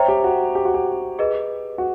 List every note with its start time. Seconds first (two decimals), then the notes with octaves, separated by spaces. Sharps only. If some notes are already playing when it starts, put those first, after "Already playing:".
Already playing: C5 C#5 E5 G5 A#5
0.08 G4
0.24 F#4
0.55 G4
0.65 F#4
0.74 G4
1.19 G#4 B4 D#5
1.78 F#4